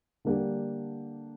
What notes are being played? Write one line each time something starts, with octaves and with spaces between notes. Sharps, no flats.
D3 G3 A#3 D4 G4